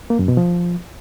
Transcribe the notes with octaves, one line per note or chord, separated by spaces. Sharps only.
A#3
F#2
B2
F3